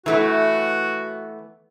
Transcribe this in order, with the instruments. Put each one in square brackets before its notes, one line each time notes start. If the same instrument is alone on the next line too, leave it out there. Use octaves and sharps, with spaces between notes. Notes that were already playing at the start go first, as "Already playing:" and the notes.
[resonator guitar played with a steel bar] E3 A3 B3 [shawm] F#4